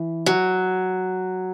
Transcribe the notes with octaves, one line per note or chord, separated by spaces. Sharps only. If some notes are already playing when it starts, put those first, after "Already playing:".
Already playing: E3
F#3